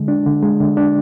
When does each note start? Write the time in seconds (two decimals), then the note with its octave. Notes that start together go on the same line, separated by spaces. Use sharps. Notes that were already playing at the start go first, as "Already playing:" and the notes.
Already playing: D3 G#3
0.08 D4
0.26 D3
0.43 G#3
0.61 D3
0.77 D4